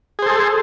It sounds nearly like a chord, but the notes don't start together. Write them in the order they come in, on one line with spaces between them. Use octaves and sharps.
G#4 C5 A4